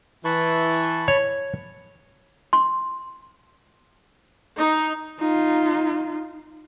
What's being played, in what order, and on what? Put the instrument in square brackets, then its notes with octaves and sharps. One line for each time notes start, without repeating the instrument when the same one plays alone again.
[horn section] E3 [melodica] A5 B5 C#6
[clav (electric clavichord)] C#5
[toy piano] C6
[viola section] D#4
[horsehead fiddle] D#4 F4